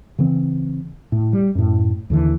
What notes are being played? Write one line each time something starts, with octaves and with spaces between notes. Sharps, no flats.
C#3 E3 C4
A2
G3
F#2 A2
D#2 D3 E3